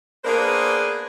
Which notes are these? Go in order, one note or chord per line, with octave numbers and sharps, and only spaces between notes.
A#3 B3 D4 G#4 A#4 C5